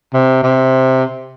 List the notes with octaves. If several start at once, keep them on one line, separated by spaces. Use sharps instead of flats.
C3
C3